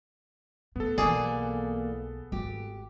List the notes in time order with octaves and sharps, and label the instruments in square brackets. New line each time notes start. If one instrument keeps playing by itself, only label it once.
[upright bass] A2 [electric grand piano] B3 A4
[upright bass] B1 [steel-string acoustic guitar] E3 A#3 D5 [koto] G#4
[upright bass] G#1 [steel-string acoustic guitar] G4